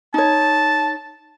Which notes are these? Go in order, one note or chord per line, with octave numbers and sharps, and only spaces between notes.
D#4 C#5 A5